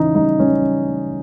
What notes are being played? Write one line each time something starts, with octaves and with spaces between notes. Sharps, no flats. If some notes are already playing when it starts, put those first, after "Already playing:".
Already playing: C#3 E3 D#4
G3 D#4
G3 C#4